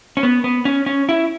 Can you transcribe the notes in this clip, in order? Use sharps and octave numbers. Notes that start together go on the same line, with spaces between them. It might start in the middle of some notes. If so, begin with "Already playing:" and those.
C#4
B3
B3
C#4
C#4
E4